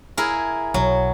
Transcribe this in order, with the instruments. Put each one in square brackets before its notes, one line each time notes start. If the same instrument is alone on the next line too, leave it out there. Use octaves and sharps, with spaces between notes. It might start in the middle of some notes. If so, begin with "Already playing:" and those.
[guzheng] E4 G#4 A#4
[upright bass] B1 [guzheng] F#3